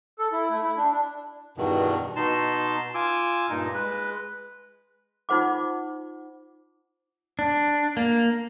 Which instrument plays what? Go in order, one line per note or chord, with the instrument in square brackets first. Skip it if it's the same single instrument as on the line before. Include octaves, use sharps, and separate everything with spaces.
[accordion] A4
E4
A3
E4
D4
D4
[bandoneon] E2 G2 B2 D#3
B2 D#4 A5 C6
F4 G#5 D6 E6
G2 A#2 D#4
G#3 B4
[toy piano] D#4 F4 C5 F#5 D6
[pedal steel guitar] D4
A#3